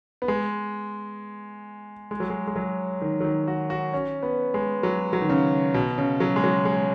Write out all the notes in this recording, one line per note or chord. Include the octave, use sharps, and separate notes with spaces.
B3
G#3
G#3
F#3
G#3
G#3
F#3
D#3
F#3
D#3
F#4
F#4
C#4
B3
G#3
F#3
F#3
D#3
C#3
B2
C#3
F#3
G#3
F#3
G#3